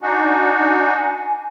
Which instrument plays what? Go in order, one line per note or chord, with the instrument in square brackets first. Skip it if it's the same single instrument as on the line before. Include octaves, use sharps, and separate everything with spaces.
[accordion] D4 D#4 F#4 [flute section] G#5